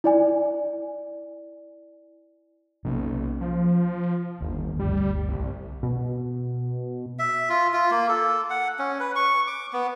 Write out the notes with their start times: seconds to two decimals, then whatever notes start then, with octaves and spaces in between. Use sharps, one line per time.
0.04 E4 D5 G#5
2.85 B1 C3 A#3 C#4
3.41 F3
4.41 G1 D#2
4.79 G1 D2 G3
5.29 C2
5.83 B2
7.19 E5
7.50 F4
7.73 F4
7.91 A#3
8.09 A4
8.50 F#5
8.79 C#4
9.00 B4
9.16 C#6
9.47 D6
9.73 B3